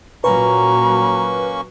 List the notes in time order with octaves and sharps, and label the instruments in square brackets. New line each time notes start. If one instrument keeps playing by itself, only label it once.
[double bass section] A#2 F#3 [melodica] A#3 C#4 C#6 [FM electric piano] B4 [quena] A#5